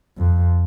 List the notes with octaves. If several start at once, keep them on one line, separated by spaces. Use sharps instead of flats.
F2